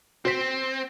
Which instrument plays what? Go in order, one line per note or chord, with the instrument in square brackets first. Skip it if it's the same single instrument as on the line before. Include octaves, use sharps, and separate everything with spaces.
[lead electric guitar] C4 [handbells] F#4 C5 B6